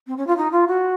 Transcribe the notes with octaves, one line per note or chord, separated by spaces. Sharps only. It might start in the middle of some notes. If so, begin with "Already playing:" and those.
C4
C#4
F4
D#4
F4
F#4